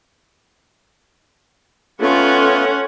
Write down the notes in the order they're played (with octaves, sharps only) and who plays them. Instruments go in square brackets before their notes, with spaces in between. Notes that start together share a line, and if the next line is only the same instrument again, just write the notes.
[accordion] A3 B3 F4 [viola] C#4 F#5 [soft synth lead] A4